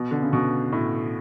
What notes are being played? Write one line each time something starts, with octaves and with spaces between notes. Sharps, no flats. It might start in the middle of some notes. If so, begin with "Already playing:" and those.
Already playing: B2
D3
C#3
B2
A2